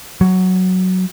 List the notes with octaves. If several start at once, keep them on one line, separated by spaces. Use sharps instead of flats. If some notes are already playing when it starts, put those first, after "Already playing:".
F#3